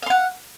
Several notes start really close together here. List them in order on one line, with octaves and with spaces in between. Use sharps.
F5 C6 F#5